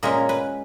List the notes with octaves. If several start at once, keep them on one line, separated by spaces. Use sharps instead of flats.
A#2 G#3 C#4 A#4
B4